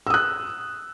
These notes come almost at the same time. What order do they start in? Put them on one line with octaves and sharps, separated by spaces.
E6 D#6 F#6